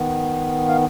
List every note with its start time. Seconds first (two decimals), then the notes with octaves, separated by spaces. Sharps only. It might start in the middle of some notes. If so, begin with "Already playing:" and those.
Already playing: D#3 B3
0.68 F5